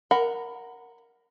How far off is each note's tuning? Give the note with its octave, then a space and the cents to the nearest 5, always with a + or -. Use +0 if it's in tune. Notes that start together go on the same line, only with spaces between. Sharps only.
A#4 +0 F#5 +0 B5 +20